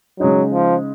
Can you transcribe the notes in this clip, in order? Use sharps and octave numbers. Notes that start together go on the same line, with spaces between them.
C#3 F#3 G#3 D#4
F3